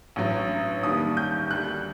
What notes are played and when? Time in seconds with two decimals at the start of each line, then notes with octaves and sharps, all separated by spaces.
0.16 A1 G2 F#3
0.83 D#2 D#3 G3 D#6
1.17 G6
1.51 D2 D3 G3 F#6